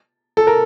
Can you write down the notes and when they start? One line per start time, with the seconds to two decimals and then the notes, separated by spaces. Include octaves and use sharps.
0.37 A4
0.47 A#4